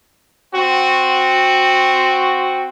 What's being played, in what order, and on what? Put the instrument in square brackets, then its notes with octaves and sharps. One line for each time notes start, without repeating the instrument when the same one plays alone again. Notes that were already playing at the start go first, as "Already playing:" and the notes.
[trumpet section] C4 F#4